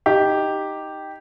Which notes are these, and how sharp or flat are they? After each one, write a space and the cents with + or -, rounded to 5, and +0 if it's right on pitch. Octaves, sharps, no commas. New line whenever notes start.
D#4 +0 G4 +0